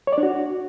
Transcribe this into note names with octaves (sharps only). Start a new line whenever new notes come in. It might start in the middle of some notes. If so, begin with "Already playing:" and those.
C#5
D5
D4
F#4